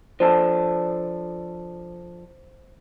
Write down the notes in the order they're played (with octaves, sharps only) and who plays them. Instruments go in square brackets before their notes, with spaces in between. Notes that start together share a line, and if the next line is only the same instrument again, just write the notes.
[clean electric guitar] F3 D4 A4 [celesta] C5